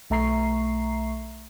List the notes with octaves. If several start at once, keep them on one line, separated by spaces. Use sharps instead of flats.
B1 A3 E5 A#5 C#6 C7